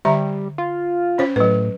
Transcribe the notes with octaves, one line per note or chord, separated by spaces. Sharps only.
D3 G3 E5 A#5
F4
C#4 C5 C#5
A2 F#3 B4